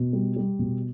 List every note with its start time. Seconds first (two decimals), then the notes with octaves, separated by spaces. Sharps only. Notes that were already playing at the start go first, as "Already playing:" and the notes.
Already playing: B2
0.13 G3
0.36 G3
0.59 B2